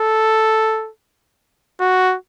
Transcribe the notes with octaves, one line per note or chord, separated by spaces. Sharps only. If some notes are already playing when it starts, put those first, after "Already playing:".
Already playing: A4
F#4